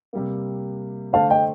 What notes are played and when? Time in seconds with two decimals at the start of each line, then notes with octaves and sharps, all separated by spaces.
0.13 C3 G3 A#3
1.13 D3 A3 D4 A4 C5 F5 A5
1.30 D#5 G5